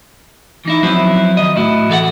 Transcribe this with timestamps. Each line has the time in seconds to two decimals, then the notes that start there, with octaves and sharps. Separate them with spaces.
0.65 E3 D#4 E4
0.83 F3 F#3 B3 C4 E4
1.37 D#3 D#5
1.56 A2 E4 F#4
1.90 E3 A4 F5 F#5